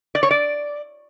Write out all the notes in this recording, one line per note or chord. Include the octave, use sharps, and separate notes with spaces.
D5
C#5
D5